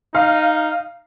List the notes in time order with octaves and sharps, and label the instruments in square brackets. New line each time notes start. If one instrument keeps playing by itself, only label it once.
[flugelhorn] D#4 [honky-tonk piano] F5